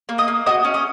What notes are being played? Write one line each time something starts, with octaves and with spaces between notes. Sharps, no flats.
A#3
D#5 D#6
A#3
F#4 D#5 D#6
C#4
D#5 D#6